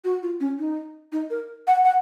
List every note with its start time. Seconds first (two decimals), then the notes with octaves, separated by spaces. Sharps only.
0.05 F#4
0.23 F4
0.40 C#4
0.59 D#4
1.12 D#4
1.30 A#4
1.67 F#5
1.85 F#5